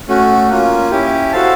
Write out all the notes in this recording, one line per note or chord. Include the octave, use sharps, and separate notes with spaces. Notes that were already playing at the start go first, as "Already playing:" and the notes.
A3 C#4 F#4
A#3 C#4 F4
C#4 E4 G4
F#4 A4 C5 F5 A5